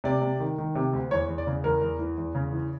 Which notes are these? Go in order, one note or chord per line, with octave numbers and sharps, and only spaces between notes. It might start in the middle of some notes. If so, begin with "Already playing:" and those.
C3 D5
C3
D#3
D#3
C3
D2
E2 C#5
E2
D5
C#3
E2 A#4
E2
E3
E2
C#3
E3